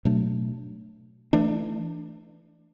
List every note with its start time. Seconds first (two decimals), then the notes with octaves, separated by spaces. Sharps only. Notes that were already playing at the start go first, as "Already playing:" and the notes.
0.05 B2 F#3 A3 D4
1.33 E3 A3 D4